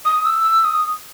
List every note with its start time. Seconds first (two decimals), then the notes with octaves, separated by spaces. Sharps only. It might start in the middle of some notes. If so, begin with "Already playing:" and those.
0.05 D#6
0.25 E6
0.44 E6
0.64 D#6